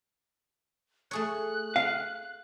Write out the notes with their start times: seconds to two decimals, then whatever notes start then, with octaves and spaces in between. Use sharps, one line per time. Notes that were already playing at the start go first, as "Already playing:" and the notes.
1.11 A3 G#4 C#5 F#6
1.76 F5